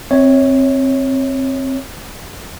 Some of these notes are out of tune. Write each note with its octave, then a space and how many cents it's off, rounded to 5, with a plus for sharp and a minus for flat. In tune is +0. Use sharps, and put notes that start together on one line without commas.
C4 +15 C#5 +0 E5 -40